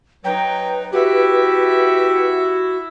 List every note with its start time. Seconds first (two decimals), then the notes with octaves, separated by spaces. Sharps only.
0.25 F#3 D#4 B4 G5
0.93 E4 F#4 G4 E5